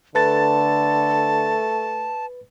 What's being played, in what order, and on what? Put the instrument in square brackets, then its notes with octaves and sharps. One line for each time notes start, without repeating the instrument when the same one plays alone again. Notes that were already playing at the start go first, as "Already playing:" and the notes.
[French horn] D3 [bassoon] A3 [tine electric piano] B4 A6 [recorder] A5